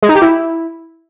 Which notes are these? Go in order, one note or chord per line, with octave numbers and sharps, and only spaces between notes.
G#3
D#4
G4
E4